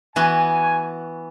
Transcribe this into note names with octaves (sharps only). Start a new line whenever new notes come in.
E3 B3 F#4 G#5